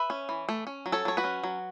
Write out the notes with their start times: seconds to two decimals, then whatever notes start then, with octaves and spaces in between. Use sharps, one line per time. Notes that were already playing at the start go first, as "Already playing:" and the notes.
Already playing: B4 E5
0.10 C#4
0.29 E3
0.49 A3
0.67 C#4
0.86 F#3
0.92 A4 C#5
1.05 F#3 C#5
1.17 F#4 B4
1.24 C#4
1.43 F#3